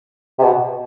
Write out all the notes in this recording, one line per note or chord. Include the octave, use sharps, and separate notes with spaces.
C3
B2